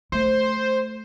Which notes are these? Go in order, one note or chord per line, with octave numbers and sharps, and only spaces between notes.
A3 C5